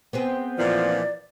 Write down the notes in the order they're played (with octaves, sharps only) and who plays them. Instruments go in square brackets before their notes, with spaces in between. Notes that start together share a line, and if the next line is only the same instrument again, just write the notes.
[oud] B3 C4 G#4
[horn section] A#2 E3 F3 [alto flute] D5